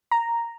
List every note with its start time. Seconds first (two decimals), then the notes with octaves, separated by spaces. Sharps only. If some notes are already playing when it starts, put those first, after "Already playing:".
0.12 A#5